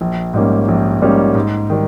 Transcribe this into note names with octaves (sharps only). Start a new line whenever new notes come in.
A#1
G#2 G3 A#3 C#4
A#1
G#2 G3 A#3 C#4
G#2
D#3 G3